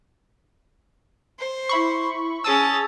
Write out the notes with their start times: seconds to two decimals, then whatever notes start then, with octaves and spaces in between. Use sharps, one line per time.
1.39 C5
1.69 E4 B5 C#6
2.44 C#4 G#4 A5 D#6 E6